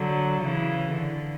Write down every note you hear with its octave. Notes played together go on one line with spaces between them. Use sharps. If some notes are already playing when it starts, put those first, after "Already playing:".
Already playing: D3 F#3
C#3 E3
D3